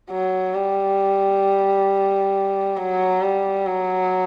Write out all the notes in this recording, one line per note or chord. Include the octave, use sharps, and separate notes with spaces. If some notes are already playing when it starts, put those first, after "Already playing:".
F#3
G3
F#3
G3
F#3